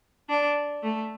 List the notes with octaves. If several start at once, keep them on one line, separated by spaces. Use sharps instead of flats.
D4
A3